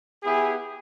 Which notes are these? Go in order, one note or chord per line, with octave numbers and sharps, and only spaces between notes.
B3 E4 G4 G#4